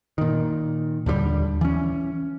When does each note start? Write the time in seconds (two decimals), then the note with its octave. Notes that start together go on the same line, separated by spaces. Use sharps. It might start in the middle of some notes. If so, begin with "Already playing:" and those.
0.18 A#2 D#3
1.06 D#2 D3 E3 G3
1.61 E3 C#4